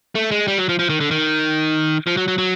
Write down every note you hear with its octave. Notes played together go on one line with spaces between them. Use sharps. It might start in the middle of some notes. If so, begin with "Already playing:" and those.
A3
G#3
G3
F#3
F3
F3
D#3
D3
D#3
F3
F#3
F#3
F#3